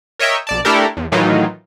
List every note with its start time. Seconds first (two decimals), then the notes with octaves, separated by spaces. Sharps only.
0.19 A#4 C#5 D#5 E5 G5
0.47 B1 D5 A5
0.65 A3 D4 E4 G4 A4 A#4
0.97 E2
1.12 A2 D#3 E3 F#3 D#4 F4